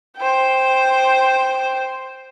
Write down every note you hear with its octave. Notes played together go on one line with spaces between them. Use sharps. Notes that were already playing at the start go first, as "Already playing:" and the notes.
C5 G5